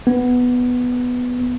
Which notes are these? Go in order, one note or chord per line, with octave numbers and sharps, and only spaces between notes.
B3